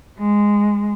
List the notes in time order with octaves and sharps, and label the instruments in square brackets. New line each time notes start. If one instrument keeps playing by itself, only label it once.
[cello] G#3